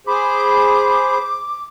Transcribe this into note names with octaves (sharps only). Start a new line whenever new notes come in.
G#4 C5 B5 D6